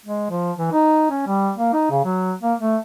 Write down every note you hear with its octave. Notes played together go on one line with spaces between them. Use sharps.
G#3
F3
E3
D#4
C#4
G3
A#3
D#4
C#3
F#3
A#3
A3